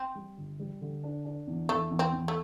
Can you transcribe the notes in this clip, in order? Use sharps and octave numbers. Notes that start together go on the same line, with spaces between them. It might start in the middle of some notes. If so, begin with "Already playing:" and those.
Already playing: C4
G3
G1
G3
D3
D4
D4
E2
E2 A3
E2
C4
E2
A3